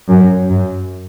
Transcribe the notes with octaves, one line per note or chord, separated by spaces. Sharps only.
F#2
F#2